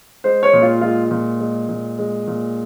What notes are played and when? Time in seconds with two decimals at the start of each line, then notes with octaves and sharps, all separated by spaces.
0.24 G#3 C5
0.43 C#5
0.53 A#2
0.62 F4
0.81 G#3 F4
1.11 A#2
1.41 G#3
1.69 A#2
1.99 G#3
2.27 A#2